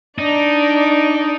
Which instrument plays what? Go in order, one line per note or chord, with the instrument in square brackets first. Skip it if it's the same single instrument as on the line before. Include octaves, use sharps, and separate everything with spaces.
[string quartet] D4 D5 [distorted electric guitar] D#4